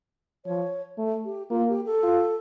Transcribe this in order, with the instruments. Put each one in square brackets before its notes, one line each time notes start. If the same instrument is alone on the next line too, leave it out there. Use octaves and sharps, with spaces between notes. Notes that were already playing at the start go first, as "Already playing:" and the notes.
[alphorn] F3 [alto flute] C#5
[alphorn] A3
[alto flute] G4
[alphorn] A#3 [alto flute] F4
[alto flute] G4
A4
[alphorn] F4